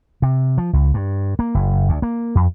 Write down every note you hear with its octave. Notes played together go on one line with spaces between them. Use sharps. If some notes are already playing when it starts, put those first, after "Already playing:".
C3
F3
C#2
G2
A#3
F#1
D2
A#3
F2